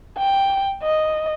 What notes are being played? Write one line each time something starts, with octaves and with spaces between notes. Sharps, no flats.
G5
D#5